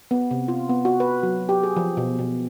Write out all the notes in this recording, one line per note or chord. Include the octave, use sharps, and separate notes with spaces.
B3
C3
F4
B3
F#4
B4
F#3
G4
G#4
F3
B2
B2